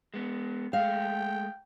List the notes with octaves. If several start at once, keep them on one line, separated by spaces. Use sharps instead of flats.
G#3 B3
G#3 A3 F5 G5